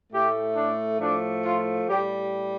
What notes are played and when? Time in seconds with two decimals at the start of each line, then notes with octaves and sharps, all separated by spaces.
0.12 A2 A3 G4
0.56 D4
1.00 A2 F3 A3 D4
1.43 F4
1.87 A2 G3 G4